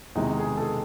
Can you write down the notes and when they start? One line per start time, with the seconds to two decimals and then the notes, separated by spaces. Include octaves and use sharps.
0.15 E2 C3 D#3 G#3 D#4
0.39 G#4
0.57 A4
0.62 G#4